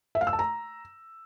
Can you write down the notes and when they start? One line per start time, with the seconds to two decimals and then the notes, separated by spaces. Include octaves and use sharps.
0.15 E5
0.21 F5
0.27 E6
0.33 A5
0.39 A#5